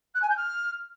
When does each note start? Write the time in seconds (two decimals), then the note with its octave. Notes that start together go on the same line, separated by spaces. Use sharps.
0.14 F#6
0.22 G#5
0.29 G6
0.36 F6